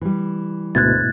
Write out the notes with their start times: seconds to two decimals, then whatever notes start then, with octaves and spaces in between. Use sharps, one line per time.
0.01 E3 G3
0.75 D2 G#2 B2 E4 F#6 G#6 A6